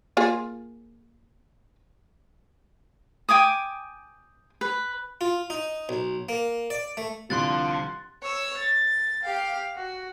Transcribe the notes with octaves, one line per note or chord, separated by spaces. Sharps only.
A#3 F4 G#4
G5 G#5 D6 D#6
B4
F4
D#4
B1
A#3
D5
A3
C2 D3 F3 C6 F#6 A6
C#5 E6
A6
G4 F5
F#4